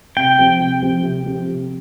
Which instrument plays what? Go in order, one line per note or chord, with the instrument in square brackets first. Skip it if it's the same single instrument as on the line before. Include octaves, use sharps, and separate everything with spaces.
[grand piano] C3 [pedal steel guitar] G5
[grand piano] F3 C4 G4
C3
F3 C4 G4
C3
F3 C4 G4
C3